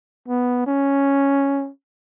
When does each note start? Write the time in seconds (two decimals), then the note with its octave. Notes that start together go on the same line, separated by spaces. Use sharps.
0.28 B3
0.67 C#4